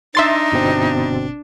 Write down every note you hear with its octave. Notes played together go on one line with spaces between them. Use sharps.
D4 D#4 E5 C6 A6
G1 B2 C4